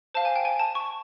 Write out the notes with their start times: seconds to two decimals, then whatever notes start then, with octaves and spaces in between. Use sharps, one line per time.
0.14 C5 F5 A5
0.25 G#5
0.36 G5
0.45 G#5
0.59 A5
0.75 C#6